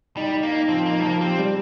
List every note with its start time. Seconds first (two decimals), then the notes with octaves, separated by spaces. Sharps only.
0.17 G3 D#4
0.34 D#4
0.43 A#3
0.51 D#4
0.69 F3 C4
0.86 A#3 D#4
1.00 G3
1.03 F3 A#3
1.20 C4 G4
1.38 G3